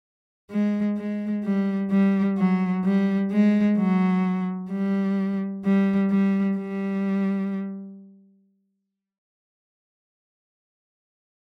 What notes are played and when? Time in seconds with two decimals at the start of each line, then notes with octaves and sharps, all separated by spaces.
0.51 G#3
0.97 G#3
1.44 G3
1.91 G3
2.38 F#3
2.85 G3
3.32 G#3
3.78 F#3
4.71 G3
5.65 G3
6.11 G3
6.57 G3